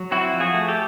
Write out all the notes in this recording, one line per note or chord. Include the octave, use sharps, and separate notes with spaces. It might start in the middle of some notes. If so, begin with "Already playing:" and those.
Already playing: F#3
C4 E4 F#4
F3
F#4 G#4
A3
G4 A4